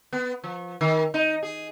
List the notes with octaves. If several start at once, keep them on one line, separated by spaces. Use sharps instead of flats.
B3
F3
D#3
D#4
G#4